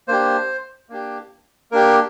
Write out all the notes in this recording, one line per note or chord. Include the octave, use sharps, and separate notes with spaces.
A#3 D4 G4 C5
A#3 D4 G4
A#3 D4 G4 A#4